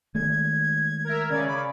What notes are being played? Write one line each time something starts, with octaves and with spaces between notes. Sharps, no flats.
D#3 G#3 A3 G#6
A#4 E5
C#3 C#4 D5 G#6
B5